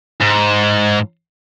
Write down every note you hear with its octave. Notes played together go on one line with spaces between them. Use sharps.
G#2